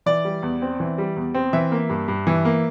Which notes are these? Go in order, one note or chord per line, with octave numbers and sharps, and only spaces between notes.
E3 D5
G3
E2
C4
E3
G3
E2
C4
E3 E5
A#3
G2
G2
E3
A#3